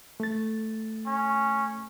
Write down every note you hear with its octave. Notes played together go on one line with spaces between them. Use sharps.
A3 A6
C#4